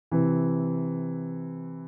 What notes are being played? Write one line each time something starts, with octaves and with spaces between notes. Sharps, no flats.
C3 E3